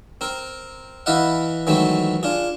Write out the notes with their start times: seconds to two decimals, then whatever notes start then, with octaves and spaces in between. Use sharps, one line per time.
0.21 C4 A#4
1.06 E3 E4 B4 D#5 F5 F#5
1.67 D#3 E3 F#3 G#3 A3 C4
2.23 D4 F4 G#4